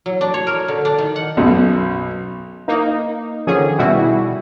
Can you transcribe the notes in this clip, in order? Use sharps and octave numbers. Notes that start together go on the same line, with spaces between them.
F#3
D4
C#5
A#4
D3
D4
D#3
F#5
B1 F#2 B2
A#3 D#4
D3 D#3 F3 C#4 G#4
B2 G3 E4 F#4